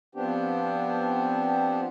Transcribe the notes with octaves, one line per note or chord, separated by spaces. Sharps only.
F3 B3 C4 D4 G4